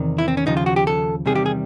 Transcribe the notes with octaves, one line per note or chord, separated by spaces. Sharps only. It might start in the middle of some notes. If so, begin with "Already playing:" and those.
Already playing: E2 C3 D#3
E4
C4
C#4
D#2 C#3 F3 D#4
F4
F#4
G4
A4
E2 C3 D#3 G3 G#4
G4
G#4